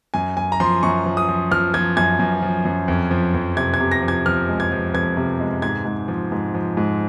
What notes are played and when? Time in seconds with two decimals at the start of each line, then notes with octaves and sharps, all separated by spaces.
0.14 F#2 G#5
0.37 F#2 G#5
0.52 A#5
0.60 F3 C6
0.83 F#2 C#6
1.06 F3
1.17 D#6
1.29 F3
1.51 F3 F6
1.74 F3 G#6
1.97 F#2 G#6
2.19 F#2
2.42 F3
2.65 F#2
2.88 F2
3.11 F3
3.34 F2
3.57 C3 G#6
3.74 G#6
3.80 C3
3.92 A#6
4.02 F3
4.08 G#6
4.26 F3 F6
4.49 G#3
4.60 G#6
4.72 F3
4.94 F2 G#6
5.17 C3
5.40 G#3
5.62 G#2 G#6
5.85 G#2
6.08 F3
6.32 G#2
6.54 F3
6.77 G#2